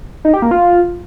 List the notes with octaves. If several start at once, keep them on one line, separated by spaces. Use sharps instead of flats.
D#4
G4
A#3
F4